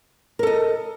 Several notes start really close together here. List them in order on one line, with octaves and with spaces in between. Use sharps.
A#4 A4 D#5